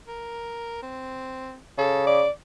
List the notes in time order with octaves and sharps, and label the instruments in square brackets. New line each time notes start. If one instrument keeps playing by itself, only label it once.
[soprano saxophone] A#4
C4
[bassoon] C#3 [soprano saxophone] A4
[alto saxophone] D5 [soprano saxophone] D6